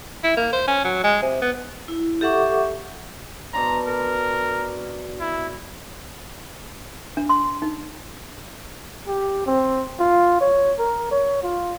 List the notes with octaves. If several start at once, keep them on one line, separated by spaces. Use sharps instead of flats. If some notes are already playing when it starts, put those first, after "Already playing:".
E4
A#3
C5
C#4
F#3
G#3
C3
B3
E4
G4 A4 E5 F#5 C#6 D6
B2 D4 A#5 C6
A#4
E4
D4
C6
D#4
G4
C4
F4
C#5
A#4
C#5
F4